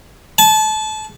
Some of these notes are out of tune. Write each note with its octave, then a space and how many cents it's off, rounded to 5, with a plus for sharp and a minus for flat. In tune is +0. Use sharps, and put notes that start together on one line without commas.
A5 -30